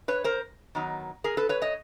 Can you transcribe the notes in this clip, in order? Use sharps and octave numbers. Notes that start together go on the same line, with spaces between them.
B4 C#5
A#4 C5
D#3 F#3 B3 D#4
G#4 A#4
A4 B4
B4 C#5
C#5 D#5